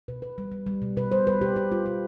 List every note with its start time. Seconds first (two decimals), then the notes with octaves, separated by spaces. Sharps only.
0.08 B2 B4
0.22 B2 B4
0.38 G3
0.52 G3
0.67 G3
0.82 B2
0.97 B2 B4
1.11 G3 C5
1.27 G3 B4
1.41 B2 G4
1.56 B2 G4
1.72 G3 F4
1.86 B2 G4